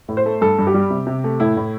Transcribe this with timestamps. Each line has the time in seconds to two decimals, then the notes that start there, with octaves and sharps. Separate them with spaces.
0.08 A2
0.17 C5
0.26 A3
0.41 G2 A4
0.59 G2
0.67 G4
0.74 G3
0.90 C3
1.07 C3
1.24 A3
1.40 A2 E4
1.57 A2